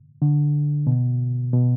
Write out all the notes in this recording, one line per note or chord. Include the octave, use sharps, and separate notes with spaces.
D3
B2
B2